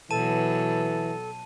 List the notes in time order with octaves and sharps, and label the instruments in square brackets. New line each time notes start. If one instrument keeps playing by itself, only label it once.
[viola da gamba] B2 F#3 [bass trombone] E3 [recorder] A4 [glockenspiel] A5 D#7